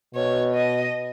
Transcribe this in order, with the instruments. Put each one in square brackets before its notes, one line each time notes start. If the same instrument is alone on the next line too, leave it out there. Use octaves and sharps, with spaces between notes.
[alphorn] B2 [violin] C#5
[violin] D#5